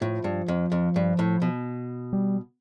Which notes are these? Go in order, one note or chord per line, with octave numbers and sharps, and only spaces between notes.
A2 F3
G2
F2
F2
G2
A2
B2
G3